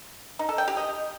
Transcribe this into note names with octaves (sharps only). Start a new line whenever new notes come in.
D#4
A4
G5
G4
D#5